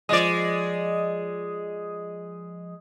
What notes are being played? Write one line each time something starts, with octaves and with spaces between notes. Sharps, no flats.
F3 G#3 D5 D#5 D#6